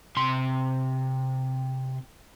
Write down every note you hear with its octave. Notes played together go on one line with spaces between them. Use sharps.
C3 C6